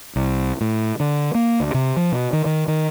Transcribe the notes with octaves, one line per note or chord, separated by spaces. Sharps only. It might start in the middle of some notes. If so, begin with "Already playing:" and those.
C2
A2
D3
A#3
D2
C3
F3
B2
D#3
D#3
D#3